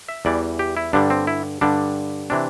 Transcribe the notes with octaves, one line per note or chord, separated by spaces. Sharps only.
E5
E2 E3 G3 D5
G4
E4
G2 D3 G3 D4
C4
E4
G2 D3 G3 D4
C3 E3 D4